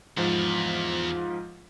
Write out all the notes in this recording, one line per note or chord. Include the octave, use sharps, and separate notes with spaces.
E2 G#2 F3